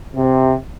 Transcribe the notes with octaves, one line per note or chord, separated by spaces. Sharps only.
C3